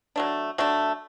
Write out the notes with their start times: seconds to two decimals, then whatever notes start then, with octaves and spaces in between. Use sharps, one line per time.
0.16 F#3 A3 D4
0.58 F#3 A3 D4